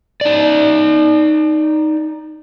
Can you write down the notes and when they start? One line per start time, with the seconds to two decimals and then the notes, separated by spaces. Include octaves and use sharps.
0.21 D#4 D5